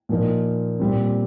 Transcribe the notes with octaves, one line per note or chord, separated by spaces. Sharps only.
A#2 F3 A#3 D#4
A#2 G3 C4